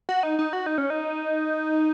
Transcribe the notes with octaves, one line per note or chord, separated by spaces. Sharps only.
F#4
D#4
D#4
F#4
D#4
C#4
D#4